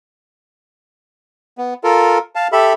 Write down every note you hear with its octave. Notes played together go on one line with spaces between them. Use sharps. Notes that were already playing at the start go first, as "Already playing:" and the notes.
B3
F4 A4 A#4
F5 A5
G4 A4 E5 B5